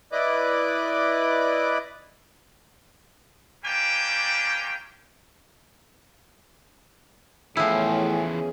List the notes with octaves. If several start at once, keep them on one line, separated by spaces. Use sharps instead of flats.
E4 B4 D5 D#5 B5 D6
G3 A#3 C#4 D4 G5
E2 A2 E3 F3 C#4 E4 G#4 C5